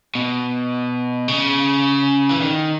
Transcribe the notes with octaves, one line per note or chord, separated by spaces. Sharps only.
B2
C#3
E3
D#3